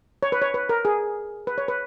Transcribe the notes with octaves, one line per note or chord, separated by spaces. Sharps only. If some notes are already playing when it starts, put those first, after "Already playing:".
C#5
B4
C#5
B4
A#4
G#4
B4
C#5
B4